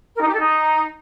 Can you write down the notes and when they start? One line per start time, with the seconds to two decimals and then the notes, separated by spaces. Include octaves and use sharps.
0.15 A#4
0.21 D#4
0.27 G4
0.33 A4
0.39 D#4